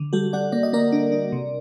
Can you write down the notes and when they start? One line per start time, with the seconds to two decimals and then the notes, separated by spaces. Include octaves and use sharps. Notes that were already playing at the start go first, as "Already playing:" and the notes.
Already playing: D3
0.13 G3 F#4 A4
0.33 G3 D5 F#5
0.52 A#3 D5
0.63 D#5
0.73 A#3 A#4 D5
0.92 D4
1.12 D4
1.32 C3